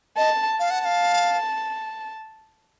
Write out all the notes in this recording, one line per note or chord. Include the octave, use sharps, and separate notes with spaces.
D#5 A5
F5 A5
F#5
F#5
F5